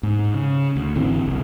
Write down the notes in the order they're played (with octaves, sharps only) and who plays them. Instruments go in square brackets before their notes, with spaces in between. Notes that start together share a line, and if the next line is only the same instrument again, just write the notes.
[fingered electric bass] G#2
C#3
D2
G#1 D3 E3 C4
F#1 C2